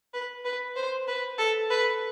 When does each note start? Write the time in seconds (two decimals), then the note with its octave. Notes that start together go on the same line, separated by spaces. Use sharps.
0.14 B4
0.45 B4
0.76 C5
1.08 B4
1.38 A4
1.70 B4